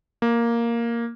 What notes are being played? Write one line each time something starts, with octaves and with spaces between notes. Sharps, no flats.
A#3